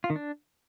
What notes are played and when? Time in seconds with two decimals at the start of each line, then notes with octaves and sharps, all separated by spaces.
0.04 F4
0.10 D#3
0.16 D4